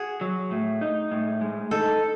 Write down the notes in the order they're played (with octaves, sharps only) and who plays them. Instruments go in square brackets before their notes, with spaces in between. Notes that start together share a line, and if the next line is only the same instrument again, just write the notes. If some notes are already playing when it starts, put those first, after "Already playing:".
Already playing: [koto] F#4 G#4
[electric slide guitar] F#3
A2
D#4
A2
G#3
[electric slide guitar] D#4 [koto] A4